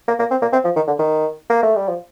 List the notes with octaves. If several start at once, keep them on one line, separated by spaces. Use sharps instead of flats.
A#3
A#3
C4
A#3
C4
F3
D#3
D3
D#3
A#3
A3
G3
F3